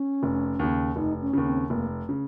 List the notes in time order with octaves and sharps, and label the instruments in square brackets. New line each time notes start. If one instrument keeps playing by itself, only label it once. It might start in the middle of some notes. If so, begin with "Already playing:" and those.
Already playing: [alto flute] C#4
[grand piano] F1
D#2 C#3
[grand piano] F1 [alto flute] D#4
[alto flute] C#4
[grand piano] D#2 C#3
[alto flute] C4
[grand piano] F1 [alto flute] A#3
[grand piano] C#3